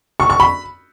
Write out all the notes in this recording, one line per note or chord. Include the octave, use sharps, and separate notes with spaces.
C#6
C#6
B5